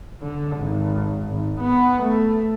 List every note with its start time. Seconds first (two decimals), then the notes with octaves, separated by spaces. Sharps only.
0.22 D3
0.57 G#1
1.28 G#1
1.60 B3
2.03 A3